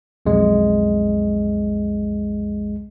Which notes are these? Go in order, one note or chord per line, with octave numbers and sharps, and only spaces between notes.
B1 F2 G#3